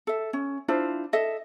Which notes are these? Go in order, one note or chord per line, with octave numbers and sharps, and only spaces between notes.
A4 E5
C#4
D4 E4 F4 C5
A4 D#5 E5